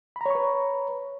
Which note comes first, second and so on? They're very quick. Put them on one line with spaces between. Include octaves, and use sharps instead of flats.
B5 A#5 C#5 C#6 B4